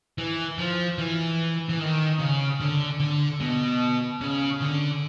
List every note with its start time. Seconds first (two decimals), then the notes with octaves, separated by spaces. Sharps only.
0.18 E3
0.58 F3
0.98 E3
1.69 E3
1.79 D#3
2.19 C#3
2.60 D3
3.00 D3
3.40 B2
4.21 C#3
4.61 D3